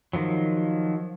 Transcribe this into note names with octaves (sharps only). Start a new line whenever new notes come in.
D#3 F3 F#3